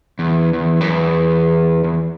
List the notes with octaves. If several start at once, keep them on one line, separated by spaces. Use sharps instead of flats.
E2
E2
F#2
E2
E2